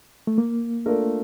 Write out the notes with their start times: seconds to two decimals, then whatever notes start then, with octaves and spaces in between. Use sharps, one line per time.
0.27 A3
0.38 A#3
0.86 A3 D4 F4 A#4